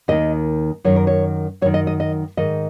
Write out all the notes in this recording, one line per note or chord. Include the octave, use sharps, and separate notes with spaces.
D#2 D#3 D#5
F#2 D#3 C#5
A#4
C#5
F#2 D#3 C#5
D#5
D#5
D#5
G#2 D#3 D#5